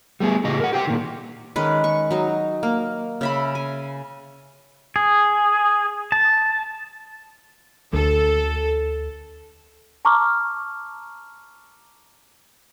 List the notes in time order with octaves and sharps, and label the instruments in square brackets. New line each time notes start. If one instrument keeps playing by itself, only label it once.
[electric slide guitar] G3 A3 B3 G#4
A2 C#3 G4 D#5
A#4 F#5
G4 C5 G5
A#2 D#3
[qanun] D#3 G#3 C#4 B4
C#6
F#3 D#4
A#3
C#3 E5 B5
G#5
[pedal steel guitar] G#4
A5
[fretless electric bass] D2 [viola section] A4
[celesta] A5 A#5 C#6 D6 F6